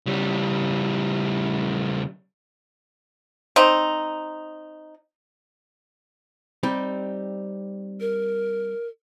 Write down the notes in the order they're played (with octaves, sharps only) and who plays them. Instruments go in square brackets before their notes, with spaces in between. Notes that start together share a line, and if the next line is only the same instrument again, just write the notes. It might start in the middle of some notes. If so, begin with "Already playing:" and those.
[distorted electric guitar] C#3 G3
[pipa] C4 D#4
[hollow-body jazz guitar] G3 C4 D#4
[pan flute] A#4